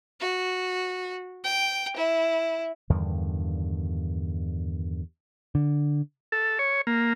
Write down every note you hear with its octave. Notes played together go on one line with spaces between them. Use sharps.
F#4
G5
E4
E2 G2 D3 D#3
D3
A4
C#5
A#3